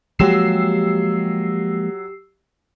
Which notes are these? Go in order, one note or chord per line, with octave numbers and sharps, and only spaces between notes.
F3 F#3 G#3 A#3 G4 E6 C7 E7